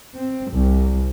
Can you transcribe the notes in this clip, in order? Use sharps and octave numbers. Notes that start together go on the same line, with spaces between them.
C4
C2